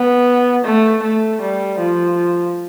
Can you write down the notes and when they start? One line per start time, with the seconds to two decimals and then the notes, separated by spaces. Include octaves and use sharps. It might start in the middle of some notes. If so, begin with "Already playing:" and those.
Already playing: B3
0.64 A3
1.02 A3
1.41 G3
1.79 F3